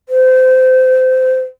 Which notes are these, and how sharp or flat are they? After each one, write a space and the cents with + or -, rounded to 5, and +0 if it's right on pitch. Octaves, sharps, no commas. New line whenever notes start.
C5 -25